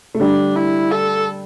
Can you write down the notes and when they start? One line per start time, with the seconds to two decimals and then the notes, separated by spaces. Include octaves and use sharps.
0.15 A3
0.20 D3 G3 D4
0.56 E4
0.91 A4